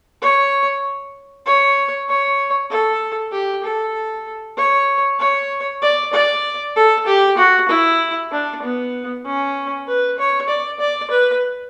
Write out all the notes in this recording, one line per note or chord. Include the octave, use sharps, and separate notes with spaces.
C#5
C#5
C#5
A4
G4
A4
C#5
C#5
D5
D5
A4
G4
F#4
E4
D4
B3
C#4
B4
C#5
D5
D5
B4